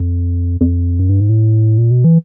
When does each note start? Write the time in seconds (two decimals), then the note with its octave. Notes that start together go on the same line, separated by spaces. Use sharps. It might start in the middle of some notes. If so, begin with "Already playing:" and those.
Already playing: F2
0.61 F2
0.99 F#2
1.09 G2
1.20 G#2
1.29 A2
1.78 A#2
1.91 B2
2.04 E3